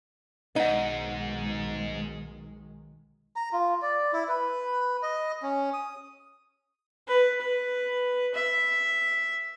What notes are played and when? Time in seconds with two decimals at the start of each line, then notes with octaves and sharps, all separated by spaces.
0.56 B1 G#2 D#3 G#3 D#4 D#5 F#5
3.36 A#5
3.53 F4
3.82 D5
4.13 E4
4.28 B4
5.03 D#5
5.43 C#4
5.73 D#6
7.07 B4
7.41 B4
8.34 E5